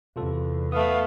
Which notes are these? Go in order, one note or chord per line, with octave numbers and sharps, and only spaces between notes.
E2 C3 F4 A4
A3 B3 F5 D#6